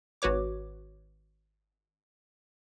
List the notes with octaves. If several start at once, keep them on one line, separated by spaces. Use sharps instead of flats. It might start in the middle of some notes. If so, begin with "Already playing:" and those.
G#1 F#4 B4 C#5 D6